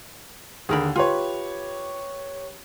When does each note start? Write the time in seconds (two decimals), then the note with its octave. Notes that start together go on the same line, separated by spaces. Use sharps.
0.69 D#2 D3 G#4 A#4 B5
0.96 F4 G4 B4 C#5